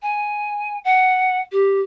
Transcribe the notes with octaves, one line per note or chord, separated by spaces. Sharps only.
G#5
F#5
G4